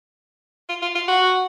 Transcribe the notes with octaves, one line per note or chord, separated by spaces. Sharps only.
F4
F4
F4
F#4